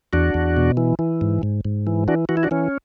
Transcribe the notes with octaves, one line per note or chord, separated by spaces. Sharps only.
E2 D4 F#4
E2
B2
E3
E3
G#2
G#2
G#2
E3
E3 D4 F#4
E3 F#4
E4
D4 F#4
E3 C#4